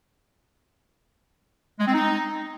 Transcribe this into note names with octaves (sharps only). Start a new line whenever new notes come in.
G#3
C4
D#4